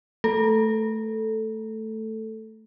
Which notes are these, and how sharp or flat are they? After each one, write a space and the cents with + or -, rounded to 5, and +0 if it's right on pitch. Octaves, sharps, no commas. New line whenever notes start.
A3 +0 A4 +0